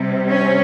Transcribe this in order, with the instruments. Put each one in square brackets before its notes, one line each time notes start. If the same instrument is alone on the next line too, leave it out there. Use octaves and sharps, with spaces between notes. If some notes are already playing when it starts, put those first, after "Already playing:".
Already playing: [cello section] C3 G3
C#4